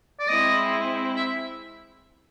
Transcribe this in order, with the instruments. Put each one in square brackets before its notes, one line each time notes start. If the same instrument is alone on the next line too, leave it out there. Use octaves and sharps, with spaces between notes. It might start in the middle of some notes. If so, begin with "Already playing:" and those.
[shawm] D5
[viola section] G#3 C4 E4 [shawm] D#5
[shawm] E5